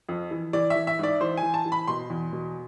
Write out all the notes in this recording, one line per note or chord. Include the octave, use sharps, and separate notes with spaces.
F2
E3
E3 D5
E5
E3
E5
G#2 D5
E3 C5
G#5
E3
A5
E3
B5
B2 C6
E2
B2